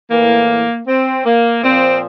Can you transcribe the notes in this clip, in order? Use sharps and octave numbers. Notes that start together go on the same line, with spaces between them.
A2 E3 A#3
C4
A#3
A#2 F3 C4